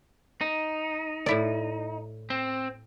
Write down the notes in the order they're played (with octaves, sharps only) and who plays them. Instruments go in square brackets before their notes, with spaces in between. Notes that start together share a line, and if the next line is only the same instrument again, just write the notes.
[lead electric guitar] D#4
[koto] A2 E4 D5
[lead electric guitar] C4